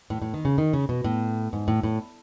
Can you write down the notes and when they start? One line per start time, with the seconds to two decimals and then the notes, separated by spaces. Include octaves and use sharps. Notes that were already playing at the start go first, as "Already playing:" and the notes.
0.10 A2
0.22 A2
0.34 D#3
0.45 C#3
0.58 D#3
0.73 C#3
0.89 B2
1.04 A2
1.53 G#2
1.68 A2
1.83 A2